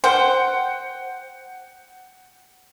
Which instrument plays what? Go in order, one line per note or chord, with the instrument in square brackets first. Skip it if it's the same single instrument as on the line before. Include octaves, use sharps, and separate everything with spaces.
[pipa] C5 [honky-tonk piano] F#5 G5